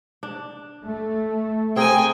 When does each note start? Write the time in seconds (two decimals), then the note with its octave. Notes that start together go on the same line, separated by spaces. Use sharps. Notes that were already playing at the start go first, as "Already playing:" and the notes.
0.23 D4
0.85 A3
1.76 C4 G#4 A#4 G5 G#5